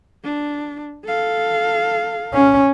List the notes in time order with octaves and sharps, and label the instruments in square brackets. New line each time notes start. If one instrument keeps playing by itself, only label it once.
[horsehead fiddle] D4
A4 F5
[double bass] C#4